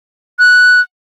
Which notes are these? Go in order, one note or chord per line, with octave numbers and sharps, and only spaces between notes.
F#6